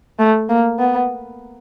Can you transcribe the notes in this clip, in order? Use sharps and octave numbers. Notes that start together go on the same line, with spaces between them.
A3
A#3
B3